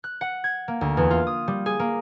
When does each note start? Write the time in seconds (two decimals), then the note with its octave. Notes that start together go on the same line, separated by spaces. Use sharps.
0.04 F#6
0.21 F#5
0.44 G#6
0.68 A#3
0.81 D2
0.97 E2
1.11 F4
1.27 D#6
1.48 G3
1.66 G#4
1.79 A#3